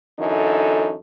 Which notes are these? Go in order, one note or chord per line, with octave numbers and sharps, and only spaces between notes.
F#2 D3 E3 D#4 A4